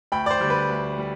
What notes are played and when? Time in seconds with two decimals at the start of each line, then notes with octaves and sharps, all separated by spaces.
0.12 D2 G5 B5
0.26 D5
0.31 C5
0.41 D3 G3
0.50 B4
0.69 D2
0.98 G3